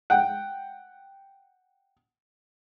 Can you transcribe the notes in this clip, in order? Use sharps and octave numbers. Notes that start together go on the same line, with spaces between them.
F#5 G5